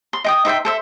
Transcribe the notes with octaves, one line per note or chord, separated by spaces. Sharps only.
C6
D#5 G5 D#6
D#4 C5 E5 G5
A4 C5 E5